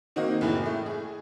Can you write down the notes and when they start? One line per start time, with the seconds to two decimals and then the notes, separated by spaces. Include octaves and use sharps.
0.16 D#3 A#3 C4 F#4 D#5
0.41 F#1 A2 E3 G#3
0.64 A2 A3
0.86 G#4